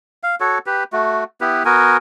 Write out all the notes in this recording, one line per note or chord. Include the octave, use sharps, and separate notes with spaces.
F5
F#4 A4 C#5
G4 B4
A3 F#4
B3 E4 G4 B4
B3 F#4 A#4 G#5